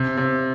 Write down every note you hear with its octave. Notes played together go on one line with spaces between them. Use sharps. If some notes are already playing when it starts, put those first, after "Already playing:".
Already playing: C3
C3